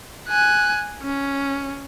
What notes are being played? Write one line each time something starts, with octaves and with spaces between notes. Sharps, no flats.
G#5 F#6
C#4